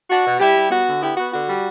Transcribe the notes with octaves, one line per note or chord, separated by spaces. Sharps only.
D4 F#4
B2
G3 E4 G4
G3
B3 F#4
D3
B3 E4 G4
B3 F#4
D3 F#4
G3